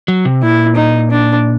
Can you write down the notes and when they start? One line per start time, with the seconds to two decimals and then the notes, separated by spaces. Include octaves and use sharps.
0.08 F#3
0.25 C3
0.43 A#2 E4
0.76 D#4
1.11 D4